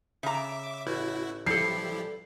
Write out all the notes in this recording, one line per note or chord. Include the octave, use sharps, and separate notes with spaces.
C#3 E5 A#5 D6
A1 E4 F#4
F3 G3 E4 G4 A4 C7